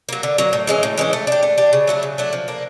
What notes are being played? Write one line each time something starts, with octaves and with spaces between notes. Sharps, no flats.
F#3 A#3
D3
F#3 A#3
A2
E3 G#3 C#4
A2
E3 G#3 C#4
A3
D4 G4
A3
D4 G4
C#3
F#3 A3 D4
C#3
F#3 A3 D4
F3
A#3 D4